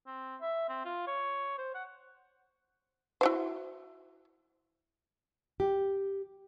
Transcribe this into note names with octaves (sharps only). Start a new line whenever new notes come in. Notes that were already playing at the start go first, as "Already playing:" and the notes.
C4
E5
C4
F4
C#5
C5
F#5
E4 F#4 C5
G4